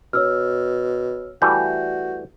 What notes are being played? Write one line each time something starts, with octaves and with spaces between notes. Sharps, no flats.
B2 C#5 E6 F6
E3 G3 A3 F#4 G6